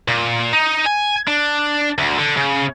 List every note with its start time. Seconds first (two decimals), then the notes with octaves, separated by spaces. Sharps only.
0.08 A#2
0.53 D#4
0.85 G#5
1.27 D4
1.98 D2
2.18 D3
2.37 C#3